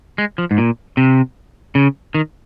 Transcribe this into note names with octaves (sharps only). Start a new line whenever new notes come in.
G#3
F3
G#2
A#2
C3
C#3
D#3